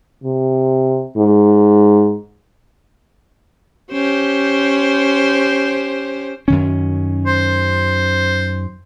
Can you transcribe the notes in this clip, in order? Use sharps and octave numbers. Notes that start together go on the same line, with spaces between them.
C3
G#2
C#4 G4 C5
F#2 D#3 C#4
C5